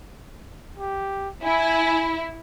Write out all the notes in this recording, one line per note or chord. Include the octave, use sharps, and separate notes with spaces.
G4
E4 G#5